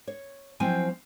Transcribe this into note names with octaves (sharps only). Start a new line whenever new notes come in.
C#5
F3 F#3 C4 E4 G#5